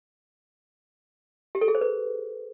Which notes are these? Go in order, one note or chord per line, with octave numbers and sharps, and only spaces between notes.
G4
A4
G#4
C5
B4